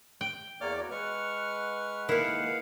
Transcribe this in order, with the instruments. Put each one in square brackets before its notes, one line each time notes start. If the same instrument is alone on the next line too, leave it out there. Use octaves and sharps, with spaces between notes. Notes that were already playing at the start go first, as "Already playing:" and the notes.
[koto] G5
[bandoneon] E2 D5 D6 [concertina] A#3 C#5 F6
[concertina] F#4 C#5
[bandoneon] G#3 B4 [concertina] F#5 C#6 F6
[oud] D#3 A#3 [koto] E4 [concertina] F5 F#5